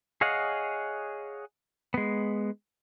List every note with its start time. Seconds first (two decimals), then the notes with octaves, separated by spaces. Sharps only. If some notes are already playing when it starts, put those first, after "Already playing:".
0.21 G#4 C#5 D#5 F5 F#5
1.94 G#3 B3